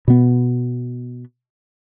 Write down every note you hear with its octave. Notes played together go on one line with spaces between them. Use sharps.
B2 B3